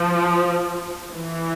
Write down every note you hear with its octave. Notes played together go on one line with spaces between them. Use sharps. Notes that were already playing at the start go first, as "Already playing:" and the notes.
Already playing: F3
E3